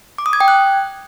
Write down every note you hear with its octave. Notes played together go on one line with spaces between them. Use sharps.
D6
D#6
G#6
G5
F#6